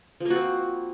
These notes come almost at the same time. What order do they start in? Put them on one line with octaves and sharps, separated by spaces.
F3 A#3 F#4 C4